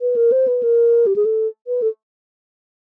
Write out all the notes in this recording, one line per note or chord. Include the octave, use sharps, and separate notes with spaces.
B4
A#4
C5
B4
A#4
G4
G#4
A4
B4
A4